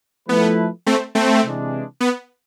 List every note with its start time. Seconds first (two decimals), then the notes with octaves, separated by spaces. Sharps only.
0.28 F3 A3 B3 E4 B4
0.86 A3 C4
1.15 A3 C4
1.43 C3 E3 G#3 D4
2.00 B3